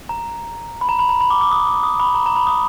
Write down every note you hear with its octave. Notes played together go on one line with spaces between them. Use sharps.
A#5
B5
A#5
B5
A#5
B5
D6
D6
D#6
D#6
B5
A#5
A#5
B5
D#6